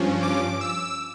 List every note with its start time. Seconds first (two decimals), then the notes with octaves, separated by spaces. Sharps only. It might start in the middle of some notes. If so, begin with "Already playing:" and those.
Already playing: G2 F3 C#4
0.23 D6
0.61 E6